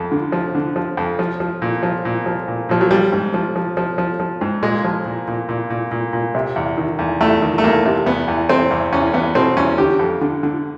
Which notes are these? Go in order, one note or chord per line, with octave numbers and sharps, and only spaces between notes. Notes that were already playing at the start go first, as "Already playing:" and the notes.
Already playing: F2
D3
F3
D3
F3
F2
F3
F3
A#2
F3
A#2
F3
A#2
A#2 F3
F#3
F3 G3
G#2
F3
F3
F3
F3
F3
G#2
A#2 G#3
F3
A#2
A#2
A#2
A#2
A#2
A#2
C3
E2
D#3
E2
E2 A3
D#3
A3
E2 A#3
C3
E2 B3
E2
E2 C4
E2
E2 C#4
E2 B3
B2 C4
E2 C#4
D3 G4
F2
D3
D3